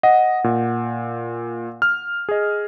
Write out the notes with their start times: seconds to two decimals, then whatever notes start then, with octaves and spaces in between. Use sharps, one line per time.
0.03 D#5 F#5
0.44 A#2
1.82 F6
2.29 G#4 D#5